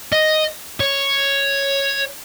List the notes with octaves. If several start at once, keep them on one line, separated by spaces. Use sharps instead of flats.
D#5
C#5